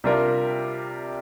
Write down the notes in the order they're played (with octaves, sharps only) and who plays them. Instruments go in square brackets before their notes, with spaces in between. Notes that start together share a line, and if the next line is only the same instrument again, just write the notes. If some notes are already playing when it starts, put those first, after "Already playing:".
[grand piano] C3 G3 D4 F4 A#4